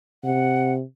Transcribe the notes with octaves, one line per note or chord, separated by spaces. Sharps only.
C3 F#5